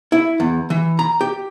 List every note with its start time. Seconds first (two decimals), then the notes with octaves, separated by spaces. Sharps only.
0.12 E4
0.40 E2
0.70 E3
0.99 A#5
1.21 G4